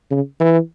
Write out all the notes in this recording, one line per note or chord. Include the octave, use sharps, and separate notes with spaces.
C#3
E3